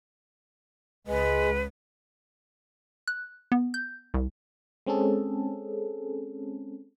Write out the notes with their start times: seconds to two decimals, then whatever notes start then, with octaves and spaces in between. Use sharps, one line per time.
1.07 C#2 G#3 B4
3.08 F#6
3.52 B3
3.74 G6
4.14 C2
4.87 G#3 C4 C#4 G#4 A4